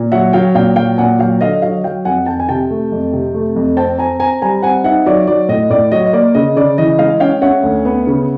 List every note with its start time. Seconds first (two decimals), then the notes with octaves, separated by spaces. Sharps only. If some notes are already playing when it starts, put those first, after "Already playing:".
Already playing: A#2
0.12 F#3 E5 F#5
0.33 F#3 F5 G5
0.55 A#2 F5 G5
0.76 F#3 F5 G5
0.98 A#2 F#5 G#5
1.19 F#3 F5 G5
1.40 D3 D#5 F5
1.62 F#3 D#5 F5
1.84 F#3 F5 G5
2.05 F2 F#5 G#5
2.26 F2 G5 A5
2.40 G#5
2.49 C3 G5 A5
2.71 A3
2.92 F2
3.13 C3
3.34 A3
3.56 F2
3.77 C4 G5 A5
3.98 C4 G#5 A#5
4.20 C4 G#5 A#5
4.42 G3 G#5 A#5
4.63 C4 F#5 G#5
4.84 D#4 E5 F#5
5.06 F#3 D5 E5
5.27 F#3 D5
5.49 A2 D#5
5.70 A2 D5
5.92 F#3 D#5
6.06 D#5
6.13 A#3 D5
6.35 C#3 D#5
6.56 C#3 D5
6.78 E3 D#5
6.99 G#3 D#5 F5
7.20 C#4 F5 G5
7.42 C#4 E5 F#5
7.63 D2
7.85 B3
8.07 C#3